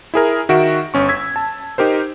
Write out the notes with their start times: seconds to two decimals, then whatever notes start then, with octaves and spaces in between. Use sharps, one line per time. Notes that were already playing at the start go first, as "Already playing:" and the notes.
0.14 E4 G#4 A#4
0.49 D#3 F#4 E5 D7
0.94 G1 C#4 C#6
1.09 E6 G#6 B6
1.36 A5
1.78 D#4 G4 A#4 C5